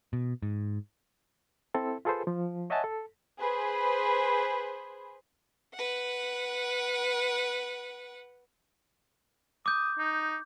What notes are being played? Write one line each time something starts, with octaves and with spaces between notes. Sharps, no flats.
B2
G#2
C4 E4 A4
F4 G#4 A4 B4 C5
F3
C#5 D#5 E5 F#5 G#5 A5
A4
G#4 B4 C5
B4 F#5
D6 D#6 G6
D#4